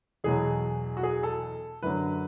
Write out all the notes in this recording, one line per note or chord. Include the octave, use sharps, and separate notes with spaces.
E2 B2 F#3 G#4
F#4
G#4
A4
F#2 D3 F#3 B4